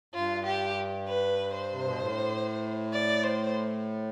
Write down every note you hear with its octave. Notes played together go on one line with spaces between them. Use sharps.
G2 F4
G4
B4
C5
C3
B2
A2
D5
C5